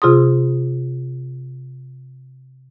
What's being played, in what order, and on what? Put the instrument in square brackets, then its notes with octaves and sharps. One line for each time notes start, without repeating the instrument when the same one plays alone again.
[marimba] C3 F4 G#4 C6 D#6